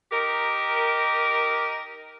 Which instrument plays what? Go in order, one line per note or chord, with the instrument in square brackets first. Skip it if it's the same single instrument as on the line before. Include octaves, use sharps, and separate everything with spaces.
[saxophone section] D#4 G4 A#4